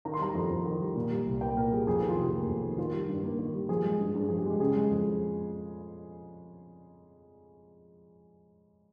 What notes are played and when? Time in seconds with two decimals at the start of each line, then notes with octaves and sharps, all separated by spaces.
0.05 D#3 A#5
0.14 C6
0.20 G3 A#5
0.35 F2
0.50 F2
0.65 D#3
0.80 G3
0.96 A#2
1.11 G3
1.26 C2
1.41 A#3 G5
1.57 A#2 A#4
1.72 G3 G#4
1.87 F2 G#4
1.98 D#3 G4
2.08 F4
2.17 F1 G4
2.33 A#3
2.47 F2
2.63 D#3
2.78 D#3 F4
2.93 G3
3.09 G2
3.23 A#3
3.39 D#3
3.54 G3
3.69 F3 G#4
3.85 G#3
4.00 G2
4.14 G2 G#4
4.29 F3 G#4
4.38 G4
4.45 G#3
4.50 G4
4.60 C#3 G#4
4.76 G#3
4.91 F2